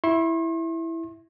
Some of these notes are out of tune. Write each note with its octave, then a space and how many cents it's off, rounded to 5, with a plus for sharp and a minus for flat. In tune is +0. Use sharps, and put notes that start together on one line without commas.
E4 +0 C6 +45